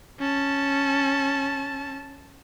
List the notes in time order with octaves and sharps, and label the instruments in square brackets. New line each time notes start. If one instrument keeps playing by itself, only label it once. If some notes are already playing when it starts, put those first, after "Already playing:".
[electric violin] C#4 A5